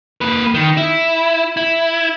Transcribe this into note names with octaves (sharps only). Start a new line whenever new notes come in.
A#3 B4
D#3
E4
E4